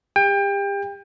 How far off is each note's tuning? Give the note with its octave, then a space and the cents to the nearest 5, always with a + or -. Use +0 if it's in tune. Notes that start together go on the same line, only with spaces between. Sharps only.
G4 +35 G5 +30